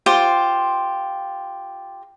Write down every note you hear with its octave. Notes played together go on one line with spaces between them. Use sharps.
F4 G4 C5